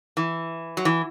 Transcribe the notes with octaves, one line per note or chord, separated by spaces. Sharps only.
E3
F#3
E3